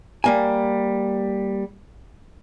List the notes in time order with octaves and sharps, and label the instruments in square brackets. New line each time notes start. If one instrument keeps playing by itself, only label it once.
[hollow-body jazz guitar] G3 A#3 G#5